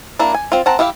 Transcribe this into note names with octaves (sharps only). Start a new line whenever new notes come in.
A#3 D4 E4
G#5
C4 F4
C4 F#5 A5 A#5
E4 G4 E5 F5